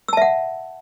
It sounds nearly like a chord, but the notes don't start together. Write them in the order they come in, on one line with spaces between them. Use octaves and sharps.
E6 A5 E5 F#5